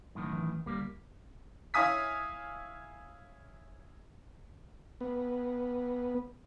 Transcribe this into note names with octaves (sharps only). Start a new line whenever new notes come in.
F#2 A2 D#3
E3
D2 G3 A#3
E4 C#5 F5 G#5 D#6 B6
B3